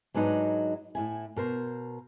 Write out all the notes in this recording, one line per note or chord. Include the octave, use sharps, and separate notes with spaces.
G#2 F#3 D4 D#4 B4
A2 E4 G#5
B2 A#4 C5